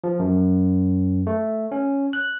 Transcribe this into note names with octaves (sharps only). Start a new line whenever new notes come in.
F3
F#2
A3
C#4
F#6